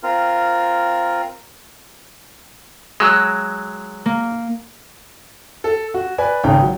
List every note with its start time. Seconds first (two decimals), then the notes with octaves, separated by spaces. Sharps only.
0.03 C4 F4 A#4
3.00 F#3 G#3 E6
4.06 A#3
5.64 A4
5.94 F#4
6.18 B4 D5 G#5
6.43 G#1 C#3 D#4 G5
6.62 F#3